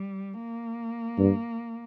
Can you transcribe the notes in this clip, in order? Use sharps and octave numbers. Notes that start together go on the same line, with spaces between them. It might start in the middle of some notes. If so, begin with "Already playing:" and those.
Already playing: G3
A#3
G2